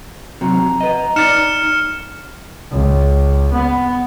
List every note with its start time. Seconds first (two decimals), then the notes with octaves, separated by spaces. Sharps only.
0.41 C3 F#3 A#5
0.59 F2
0.81 B4 D#5
1.16 D#4 D5 F6 C#7 E7
2.72 C#2
3.52 B3